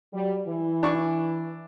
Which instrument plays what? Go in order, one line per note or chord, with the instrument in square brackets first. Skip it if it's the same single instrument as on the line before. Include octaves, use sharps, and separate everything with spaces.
[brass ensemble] F#3 G3
E3
[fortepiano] D4 E4 C#6